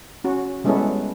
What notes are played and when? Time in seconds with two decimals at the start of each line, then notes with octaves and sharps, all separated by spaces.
0.24 C#4 F#4
0.64 G3 G#3 B3 C#4 E4 A4